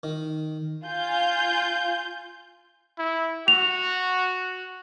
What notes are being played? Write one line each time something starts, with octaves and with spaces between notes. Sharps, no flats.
D#3
F4 G#5 G6
E4
F#4 F7